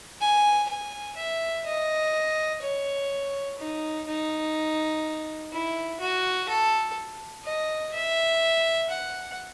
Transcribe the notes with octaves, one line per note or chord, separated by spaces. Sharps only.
G#5
G#5
E5
D#5
C#5
D#4
D#4
E4
F#4
A4
D#5
E5
F#5